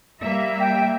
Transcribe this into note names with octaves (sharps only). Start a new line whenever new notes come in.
G3 A#3 E5
G5